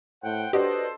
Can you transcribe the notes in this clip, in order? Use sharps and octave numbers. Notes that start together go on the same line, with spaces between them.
A2 C5 F#5 G5
D4 F#4 G4 A4 B4 C5 D#5